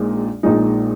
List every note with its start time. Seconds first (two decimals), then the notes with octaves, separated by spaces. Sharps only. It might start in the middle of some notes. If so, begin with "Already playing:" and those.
Already playing: A#1 A#2 G#3 D#4
0.43 A#1 A#2 G#3 D#4